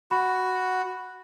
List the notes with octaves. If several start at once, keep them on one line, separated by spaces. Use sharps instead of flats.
F#4 B5